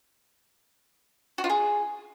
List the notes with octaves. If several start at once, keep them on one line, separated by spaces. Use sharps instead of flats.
F#4
F4
G#4